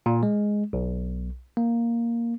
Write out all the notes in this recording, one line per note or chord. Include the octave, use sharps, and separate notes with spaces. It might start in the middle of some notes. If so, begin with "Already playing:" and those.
A#2
G#3
B1
A#3